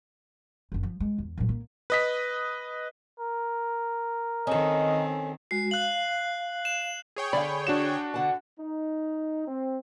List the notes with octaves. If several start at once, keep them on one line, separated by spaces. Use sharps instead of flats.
F#1 D4
F3
G#3
E2
A#2 F#3
A#3
B4 D#5 B6
A#4
D#3 C4 C#4 A4 D#5
G#3 F#4 C7
F5 F#6 F#7
E7
G#4 C#5 G5
D3 D5 F5 B5
D4 F#4 E7
D3 F#5 A5
D#4
C4